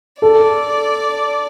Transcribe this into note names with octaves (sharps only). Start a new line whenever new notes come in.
A4 D5